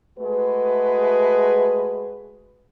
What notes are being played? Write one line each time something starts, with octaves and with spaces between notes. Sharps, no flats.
G#3 A3 F#4 B4